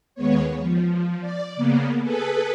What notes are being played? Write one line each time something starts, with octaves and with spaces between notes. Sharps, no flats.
D#2 G#3 B3 C#5
F3
D5
C#3 A#3 B3
G#4 A4 B4 A5